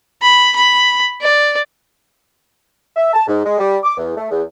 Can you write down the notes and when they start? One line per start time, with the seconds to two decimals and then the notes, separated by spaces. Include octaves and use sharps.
0.22 B5
0.56 B5
1.22 D5
2.96 E5
3.14 A5
3.27 G#2
3.45 G#3
3.59 G3
3.83 D6
3.97 E2
4.17 A3
4.31 E2